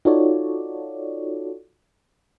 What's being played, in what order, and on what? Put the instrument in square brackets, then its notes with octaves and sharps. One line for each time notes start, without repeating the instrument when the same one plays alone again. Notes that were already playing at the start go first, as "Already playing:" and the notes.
[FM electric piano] D#4 F4 F#4 A4 C#5 D5